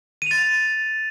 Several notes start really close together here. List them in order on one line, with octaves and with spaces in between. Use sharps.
D#7 F7 A6